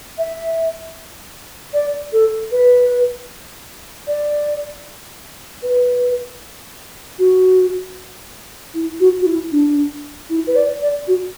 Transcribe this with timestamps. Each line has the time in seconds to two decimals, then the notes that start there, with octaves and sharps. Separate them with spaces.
0.18 E5
1.74 D5
2.13 A4
2.52 B4
4.07 D5
5.63 B4
7.19 F#4
8.74 E4
9.00 F#4
9.21 F#4
9.26 E4
9.52 D4
10.30 E4
10.47 B4
10.56 D5
10.81 D5
11.08 F#4